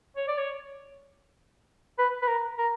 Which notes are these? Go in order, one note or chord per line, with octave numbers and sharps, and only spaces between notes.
C#5
D5
C#5
B4
B4
A#4
A#4